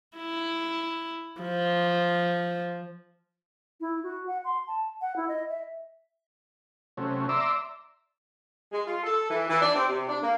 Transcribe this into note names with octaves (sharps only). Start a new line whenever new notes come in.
E4
F3
E4
F#4
F#5
C6
A5
F#5
E4
D#5
E5
C3 F#3 A3 C#4
D5 E5 A#5 C6 D6 E6
G#3
F4
A4
E3
E3
D4
C4
C3
D4
A#3